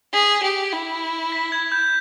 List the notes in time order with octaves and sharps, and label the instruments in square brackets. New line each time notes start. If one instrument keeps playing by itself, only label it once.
[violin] G#4 [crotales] B6
[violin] G4
E4
[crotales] B6
G#6
G6